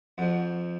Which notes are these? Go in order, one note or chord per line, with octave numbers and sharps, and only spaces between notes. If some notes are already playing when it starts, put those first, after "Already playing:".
F2 F3 F#4